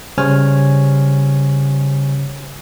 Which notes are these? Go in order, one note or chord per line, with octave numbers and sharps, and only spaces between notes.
C#3 G3 C5 C#5 G#5 F6